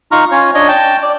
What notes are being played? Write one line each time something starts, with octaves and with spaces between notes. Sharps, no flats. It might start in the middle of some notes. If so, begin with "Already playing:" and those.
D#4 F4 A#5 C#6 F6
C#4 F4 C#5
D4 C#5 D#5
G5 A5
D5